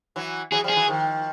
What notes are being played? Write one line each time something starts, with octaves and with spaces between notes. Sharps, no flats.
E3 F#3
E3 F#3 G#4
F3 G3
G#4
E3 F#3
D#3 F3